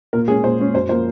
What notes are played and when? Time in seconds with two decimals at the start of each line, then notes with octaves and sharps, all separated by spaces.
0.13 A#2 A#4
0.28 G#3 C#4 G#4
0.43 A#2 C5
0.59 G#3 C#4
0.74 F#2 C5
0.89 F3 A#3 C5